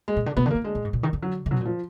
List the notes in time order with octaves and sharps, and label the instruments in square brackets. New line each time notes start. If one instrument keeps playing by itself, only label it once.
[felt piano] G#3
[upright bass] A#2
D3
[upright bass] B2 [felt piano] B3
[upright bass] D3
[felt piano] A#3
[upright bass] D#3
[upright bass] D3 [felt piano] G#3
[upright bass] A#2
G#2
A#2
D#3
D3
[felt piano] F#3
[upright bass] D3
[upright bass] B2 [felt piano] F#3
[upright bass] A#2 [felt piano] F3